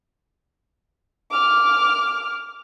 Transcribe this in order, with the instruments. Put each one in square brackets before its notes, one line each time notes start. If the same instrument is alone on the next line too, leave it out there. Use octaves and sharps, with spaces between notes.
[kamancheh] D6 F6